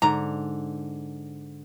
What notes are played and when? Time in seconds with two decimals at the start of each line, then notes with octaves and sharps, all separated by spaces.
0.02 G#2 D3 A#5